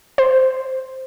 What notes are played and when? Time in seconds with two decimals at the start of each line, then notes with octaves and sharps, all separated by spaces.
0.18 C5